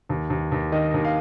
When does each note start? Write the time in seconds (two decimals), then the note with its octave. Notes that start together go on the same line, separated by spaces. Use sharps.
0.09 D#2
0.30 D#2
0.52 D#2
0.72 D#3 D#5
0.94 D#2
1.04 F5